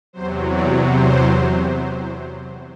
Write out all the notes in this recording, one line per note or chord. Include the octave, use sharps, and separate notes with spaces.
E2 C3 F#3 C5
D5
C5